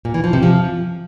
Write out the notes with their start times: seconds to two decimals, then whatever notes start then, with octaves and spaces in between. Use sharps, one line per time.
0.05 A#2
0.14 E3
0.24 F3
0.33 C3
0.43 F3